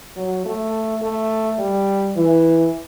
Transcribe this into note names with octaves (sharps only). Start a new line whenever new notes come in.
F#3
A3
A3
G3
E3